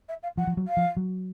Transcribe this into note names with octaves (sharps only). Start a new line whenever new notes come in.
E5
F5
F3 F#5
F3
F#3
F5
F3
F#3